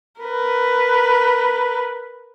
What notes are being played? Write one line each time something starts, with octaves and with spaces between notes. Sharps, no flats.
A#4 B4